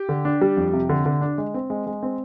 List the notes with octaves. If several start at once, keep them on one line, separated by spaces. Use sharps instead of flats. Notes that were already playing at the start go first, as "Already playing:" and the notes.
Already playing: G4
D3
D4
G3
F2
C3
D3
D3
D4
G#3
C4
G#3
G#3
C4